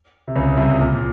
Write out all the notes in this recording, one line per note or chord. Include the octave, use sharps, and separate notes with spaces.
C3
C#2 C#3
C2 C3
A#2
A#2